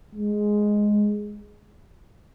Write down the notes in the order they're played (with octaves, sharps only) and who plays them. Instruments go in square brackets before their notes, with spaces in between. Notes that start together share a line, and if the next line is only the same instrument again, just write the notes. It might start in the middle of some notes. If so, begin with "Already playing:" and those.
[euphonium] G#3